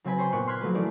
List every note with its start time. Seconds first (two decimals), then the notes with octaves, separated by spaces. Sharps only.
0.04 C#3 F#3 C4 B4 G#5 B5
0.19 C5 C#5 G5 C6
0.33 A#2 B3 C#6 F#6
0.47 C6 F6 F#6 G#6 B6
0.61 F3 F#3 A3 B4
0.74 E3 A3 A#3 C#4 G#4 D5